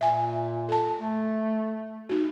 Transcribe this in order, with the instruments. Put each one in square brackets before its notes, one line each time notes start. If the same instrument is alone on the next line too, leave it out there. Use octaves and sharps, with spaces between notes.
[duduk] A#2 [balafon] E5 G#5
[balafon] A4 A5
[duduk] A3
[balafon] D#4 F#4